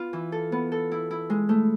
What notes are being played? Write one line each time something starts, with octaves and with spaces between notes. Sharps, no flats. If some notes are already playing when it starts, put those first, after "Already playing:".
Already playing: B3 F4
E3
A4
B3
A4
E4
E4
G#3
A3